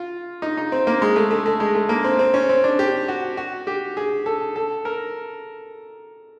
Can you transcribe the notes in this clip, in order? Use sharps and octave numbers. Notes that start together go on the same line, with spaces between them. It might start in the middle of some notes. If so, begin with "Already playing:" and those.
Already playing: F4
D#4
D#4
C4
A#3
G#3
A3
A3
A3
G#3
A3
A#3
C4
C4
C#4
C4
D4
G4
F#4
F#4
G4
G#4
A4
A4
A#4